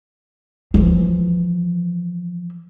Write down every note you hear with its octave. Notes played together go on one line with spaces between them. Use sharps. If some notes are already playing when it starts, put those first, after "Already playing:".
E3 F3